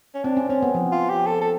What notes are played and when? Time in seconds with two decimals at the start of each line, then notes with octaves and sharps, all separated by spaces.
0.14 C#4
0.24 C4 D4
0.37 C#4
0.49 C4 C#4
0.62 B3
0.75 F3
0.92 F4
1.09 G4
1.26 A4
1.41 A4